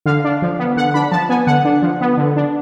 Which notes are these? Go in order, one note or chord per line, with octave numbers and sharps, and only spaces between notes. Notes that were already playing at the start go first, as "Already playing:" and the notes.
D3 F5
D4
F3
B3
D3 F#5
D4 B5
F3 A5
B3 G#5
D3 F#5
D4
F3
B3
D3
D4